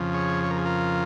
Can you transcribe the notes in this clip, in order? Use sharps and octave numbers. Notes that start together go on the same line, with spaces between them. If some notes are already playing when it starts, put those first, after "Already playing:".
Already playing: F2 C#3 F3
G#4 C#5
C#5
A#4
G#4
F4 A#4